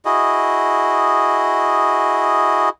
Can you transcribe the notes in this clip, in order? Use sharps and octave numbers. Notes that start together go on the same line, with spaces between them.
E4 F#4 G#4 D#5